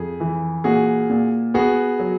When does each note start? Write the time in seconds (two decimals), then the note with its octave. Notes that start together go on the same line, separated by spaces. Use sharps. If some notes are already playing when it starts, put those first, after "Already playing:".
Already playing: F2 G#4
0.20 E3
0.64 A#2 F#4 G#4
1.10 A#2
1.54 B3 F#4 G#4
2.00 F#3